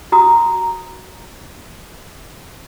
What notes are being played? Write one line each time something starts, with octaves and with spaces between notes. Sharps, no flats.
F#4 A#5 D#6